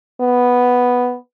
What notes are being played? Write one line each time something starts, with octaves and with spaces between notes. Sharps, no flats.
B3